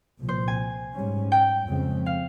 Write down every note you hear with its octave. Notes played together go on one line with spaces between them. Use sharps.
C2 A#2 F3
C5
G#5
G#2 G3 C#4
G5
F2 C#3 G#3 C4
F5